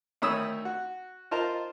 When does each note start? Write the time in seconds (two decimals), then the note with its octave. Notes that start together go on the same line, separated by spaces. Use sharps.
0.22 D2 D#3 C#5 B5 D#6 E6
0.65 F#4
1.31 D#4 F4 A#4 C5 A5 A#5